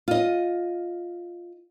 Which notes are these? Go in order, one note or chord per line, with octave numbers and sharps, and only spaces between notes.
F4 D#5